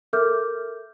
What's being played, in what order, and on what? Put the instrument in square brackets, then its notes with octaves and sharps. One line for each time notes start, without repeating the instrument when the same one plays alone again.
[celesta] A4 A#4 E5 D6 F6 G6